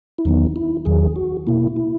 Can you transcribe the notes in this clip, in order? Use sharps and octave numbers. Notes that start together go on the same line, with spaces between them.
E4
E2 D#3 F#3 B3 D#4
E4
E2 D#3 F#3 G#4
F#4
B2 A#3 E4
E4